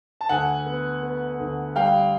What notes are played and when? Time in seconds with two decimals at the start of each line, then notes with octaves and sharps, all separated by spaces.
0.21 A5
0.29 D2 F#5 G#5
0.66 B3
1.03 B3
1.39 D2
1.76 G3 F5 G5